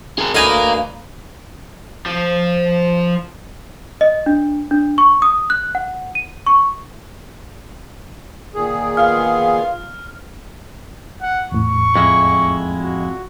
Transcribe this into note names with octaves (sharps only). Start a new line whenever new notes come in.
G#4 A#4
D2 D#4 A#4 B4 F5 G#5 A#5
F3
D#5
D4
D4
C#6
D#6
F#6
F#5
D#7
C#6
A#2 D#3 G#4
B3 F4 F5 F6
F#5
E2 A2 C#6
F2 G#3 E4
F#4